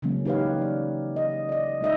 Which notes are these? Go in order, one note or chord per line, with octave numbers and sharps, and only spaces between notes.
C#3 E3 F#3 G#3 A#3 C#4
D#4 G4 B4 C#5 F5
F#3 D5
D#5
D5 D#5
G#3 D#4 D#5 E5